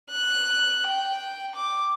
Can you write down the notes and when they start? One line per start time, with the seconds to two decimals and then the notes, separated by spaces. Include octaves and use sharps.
0.10 F#6
0.87 G5
1.55 D6